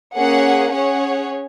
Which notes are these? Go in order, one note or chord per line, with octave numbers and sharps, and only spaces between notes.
A#3 C#4 G#4 F#5
C#4 G#4 C#5 F#5